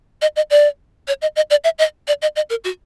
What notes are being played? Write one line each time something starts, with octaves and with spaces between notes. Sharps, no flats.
D#5
D#5
D5
C#5
D#5
D#5
D5
E5
D#5
D5
D#5
D#5
A#4
F#4